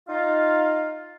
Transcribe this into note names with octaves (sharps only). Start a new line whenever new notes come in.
D#4 F4 F5